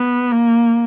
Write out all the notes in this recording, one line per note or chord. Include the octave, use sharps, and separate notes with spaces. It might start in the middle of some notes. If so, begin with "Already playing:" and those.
Already playing: B3
A#3